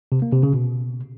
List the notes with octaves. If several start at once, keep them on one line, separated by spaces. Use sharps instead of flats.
C3
A#3
C3
C#3
B2